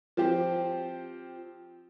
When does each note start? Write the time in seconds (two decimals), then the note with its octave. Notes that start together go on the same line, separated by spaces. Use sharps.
0.17 F3 C4 G4